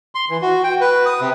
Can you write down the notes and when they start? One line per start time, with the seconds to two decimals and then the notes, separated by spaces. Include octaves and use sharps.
0.15 C6
0.30 E3
0.42 F#4
0.64 G5
0.81 B4
1.06 D#6
1.21 C3